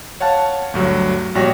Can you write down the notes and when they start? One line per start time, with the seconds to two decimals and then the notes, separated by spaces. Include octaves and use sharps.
0.20 C#5 F5 F#5 A5
0.74 D2 G2 F#3
1.35 A#1 G3 F#4 C#5 G5 A#6